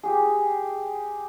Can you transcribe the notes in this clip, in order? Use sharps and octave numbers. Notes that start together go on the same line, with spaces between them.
G4 G#4